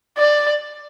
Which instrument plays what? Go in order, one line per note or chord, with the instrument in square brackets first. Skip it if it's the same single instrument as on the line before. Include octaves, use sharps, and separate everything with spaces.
[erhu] D5